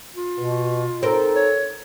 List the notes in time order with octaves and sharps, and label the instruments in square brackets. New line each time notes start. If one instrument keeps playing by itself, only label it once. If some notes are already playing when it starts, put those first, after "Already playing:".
[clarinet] F4
[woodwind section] B2
[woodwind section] C4 D#4 A4 [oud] A#4 C5
[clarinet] C#5